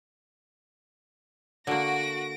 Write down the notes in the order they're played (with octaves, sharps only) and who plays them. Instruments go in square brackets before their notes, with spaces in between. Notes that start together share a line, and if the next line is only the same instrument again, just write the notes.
[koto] D3 A#3 [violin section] F#4 [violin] A#6 D7